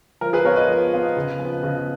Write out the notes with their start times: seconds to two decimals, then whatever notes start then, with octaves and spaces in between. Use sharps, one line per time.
0.21 F3 A#4
0.33 G#4 B4
0.44 B3 F4 A#4 C#5
0.56 B4 D#5
0.68 F3
0.93 B3 F4
1.16 C#3
1.39 F3 B3
1.63 C#3